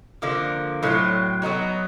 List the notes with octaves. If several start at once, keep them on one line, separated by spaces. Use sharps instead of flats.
D3 F3 A#3
A2 F#3 A3 C4
F#3 B3 D#4 F#4